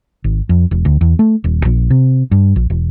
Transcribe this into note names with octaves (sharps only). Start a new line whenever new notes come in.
G#1
F2
E1
D2
E2
A3
D#1
A#1
C3
G2
A#1
E1